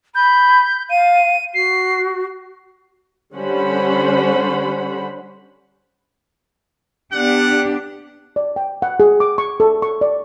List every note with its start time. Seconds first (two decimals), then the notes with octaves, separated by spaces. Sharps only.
0.15 B5 G6
0.90 F5 D#7
1.54 F#4 C7
3.36 D3 G3 C#4 C5 F#5 B5
7.13 B3 D4 G4 F#5
8.36 D5
8.56 G5
8.82 F#5
9.00 G#4
9.20 D6
9.38 C#6
9.60 A4
9.82 C#6
10.01 D5